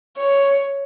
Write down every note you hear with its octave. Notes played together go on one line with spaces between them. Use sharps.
C#5